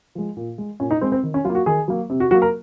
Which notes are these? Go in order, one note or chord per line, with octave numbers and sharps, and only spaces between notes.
F3 G#3
A#2
G#3
A#2 C#4
D#4
G#3 C4
C4
D#3
C#4
F#3 F4
A#3
F#4
D#3 G#4
F#3 A#3
C3
F#4
F#3 A#3 F#4
A#4